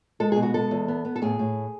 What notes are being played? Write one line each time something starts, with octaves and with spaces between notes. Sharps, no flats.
G#3 A4
B2 G#4
F#4
G#3 A4
E2
B3
B3
A4
A2 G#4
A2